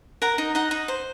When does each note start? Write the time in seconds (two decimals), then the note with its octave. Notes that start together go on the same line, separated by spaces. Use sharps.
0.22 A#4 F#5 A#5
0.38 D#4
0.55 D#4 F#5 A#5
0.71 D#4
0.88 C5